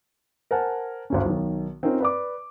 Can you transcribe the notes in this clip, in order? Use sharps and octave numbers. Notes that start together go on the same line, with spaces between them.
A#4 C5 F#5 G#5 A5
G#1 D2 C#4
B1 D#3
C4 C#4 D#4 F4 A#4 C5
B4 D5 D6